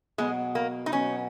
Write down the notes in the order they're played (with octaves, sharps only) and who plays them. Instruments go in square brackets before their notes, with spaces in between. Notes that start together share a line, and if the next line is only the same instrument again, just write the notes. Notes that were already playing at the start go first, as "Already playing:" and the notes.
[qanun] B2 F#3 B3 [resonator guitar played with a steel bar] G#3
[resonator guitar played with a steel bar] A#3
D#4
[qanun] B2 F#3 B3 [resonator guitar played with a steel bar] C#4